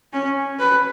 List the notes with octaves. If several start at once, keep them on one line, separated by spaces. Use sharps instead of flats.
C#4
B4